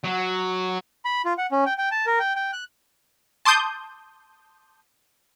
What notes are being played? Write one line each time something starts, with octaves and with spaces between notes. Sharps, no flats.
F#3
B5
F4
F#5
C#4
G5
G5
A5
A#4
G5
G5
F#6
A5 C6 D6 D#6 G6